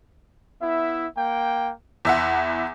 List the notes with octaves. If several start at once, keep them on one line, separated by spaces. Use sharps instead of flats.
B3 E4 E5
A#3 G5
E2 E4 E5 F#5 C6